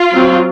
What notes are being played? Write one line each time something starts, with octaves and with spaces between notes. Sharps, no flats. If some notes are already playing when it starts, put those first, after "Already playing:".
Already playing: F4
F#3 C4